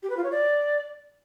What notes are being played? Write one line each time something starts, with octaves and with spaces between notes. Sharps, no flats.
G4
B4
F4
C#5
D5